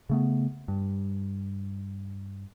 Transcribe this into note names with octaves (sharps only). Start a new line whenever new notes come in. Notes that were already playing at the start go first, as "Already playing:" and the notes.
C#3 A3 B3
G2